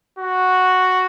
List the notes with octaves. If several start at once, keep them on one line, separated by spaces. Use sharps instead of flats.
F#4